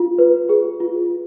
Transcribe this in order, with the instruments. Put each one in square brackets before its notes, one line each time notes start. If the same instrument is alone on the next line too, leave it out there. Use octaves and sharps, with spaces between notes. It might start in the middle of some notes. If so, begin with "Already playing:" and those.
Already playing: [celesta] F4
B4
G#4
F4
F4